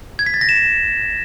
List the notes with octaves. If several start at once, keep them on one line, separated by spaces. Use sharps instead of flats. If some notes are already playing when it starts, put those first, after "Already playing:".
G#6
B6
A6
A#6
E7